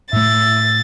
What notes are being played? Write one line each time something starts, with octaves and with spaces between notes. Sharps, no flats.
A2 A3 E5 A6